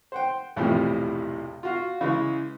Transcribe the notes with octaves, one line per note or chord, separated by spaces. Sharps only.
C5 F#5 G5
B1 E2 A2 C3 F3 G3
F4 F#4 F5
C#3 E3 G#3